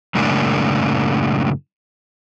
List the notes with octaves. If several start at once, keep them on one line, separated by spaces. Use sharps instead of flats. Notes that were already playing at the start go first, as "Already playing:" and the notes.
F#2 A2 C#3 G#3 A#3 D4